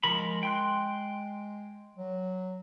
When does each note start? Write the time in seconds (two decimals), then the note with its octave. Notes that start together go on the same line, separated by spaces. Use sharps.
0.04 F3 G#3 A#4 B5
0.43 G5 C6 F#6
1.97 F#3